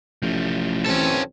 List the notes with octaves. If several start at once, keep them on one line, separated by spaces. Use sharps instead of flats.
A1 F3 A3
B1 E3 C4 C#4 A4